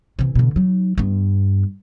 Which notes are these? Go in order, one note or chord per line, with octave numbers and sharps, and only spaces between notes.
C3 E3
B2 D3
F#3 D#4
G2 B3